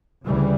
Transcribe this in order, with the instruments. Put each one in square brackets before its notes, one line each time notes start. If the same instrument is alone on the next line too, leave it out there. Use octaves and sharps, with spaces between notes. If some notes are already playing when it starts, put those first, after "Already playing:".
[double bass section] D2 C#3 E3 G3